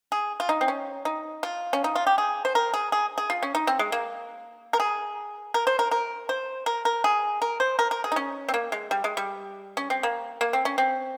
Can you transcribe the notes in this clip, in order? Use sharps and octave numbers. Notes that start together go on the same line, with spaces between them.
G#4
F4
D#4
C4
C#4
D#4
F4
C#4
D#4
F4
G4
G#4
C5
A#4
G#4
G#4
G#4
F4
C#4
D#4
C4
G#3
A#3
A#4
G#4
A#4
C5
A#4
A#4
C5
A#4
A#4
G#4
A#4
C5
A#4
A#4
G#4
D#4
C#4
C4
A#3
G#3
G3
G#3
G3
C#4
C4
A#3
A#3
C4
C#4
C4